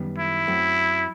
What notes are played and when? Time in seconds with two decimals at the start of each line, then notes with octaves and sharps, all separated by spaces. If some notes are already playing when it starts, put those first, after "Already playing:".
Already playing: F#2 D#3 G3 B3
0.18 E4
0.47 F#2 F#3 A3 C4